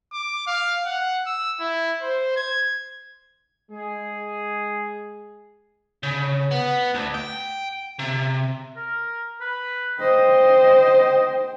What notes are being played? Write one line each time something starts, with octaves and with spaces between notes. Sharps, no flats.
D6
F5
F#5
E6
E4
C5
G#6
G#3 G#4
C#3
B3
D2
G5
C3
A#4
B4
C5 D#5 G5